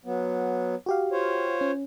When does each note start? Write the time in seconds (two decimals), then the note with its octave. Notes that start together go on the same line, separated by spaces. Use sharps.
0.05 F#3 B3
0.86 F#4 G4 F5
1.12 F4 C5 C#5
1.61 C#4